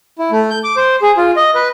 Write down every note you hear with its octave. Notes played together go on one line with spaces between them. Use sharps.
E4
A3
G6
D6
C5
G#4
F4
D#5
B4